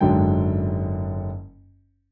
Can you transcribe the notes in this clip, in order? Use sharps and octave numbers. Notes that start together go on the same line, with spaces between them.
F#1 G#2 D3 F#3 G5